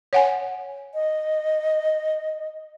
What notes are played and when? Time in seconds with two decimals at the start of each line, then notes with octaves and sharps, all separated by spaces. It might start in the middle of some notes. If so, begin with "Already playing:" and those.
0.13 C#5 F#5 G#5
0.94 D#5